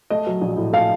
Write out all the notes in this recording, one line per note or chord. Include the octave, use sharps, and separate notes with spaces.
A3 D#5
F#3
A#1
A2
A3 F5